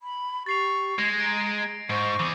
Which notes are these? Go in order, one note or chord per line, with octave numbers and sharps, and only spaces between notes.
B5
G4 C#6 A6 C7 F7
G#3 G#6 A#6
A#5 D7
G#2 C5 C#6 A#6
E3 G#4 D6